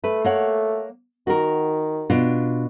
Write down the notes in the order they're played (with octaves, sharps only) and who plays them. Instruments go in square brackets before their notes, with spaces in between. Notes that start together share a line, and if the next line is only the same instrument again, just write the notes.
[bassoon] A3 [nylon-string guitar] B4
[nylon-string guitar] A#3 C#5 F#5
[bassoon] D#3 [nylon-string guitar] F#4 A#4
[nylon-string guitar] B2 D4 F4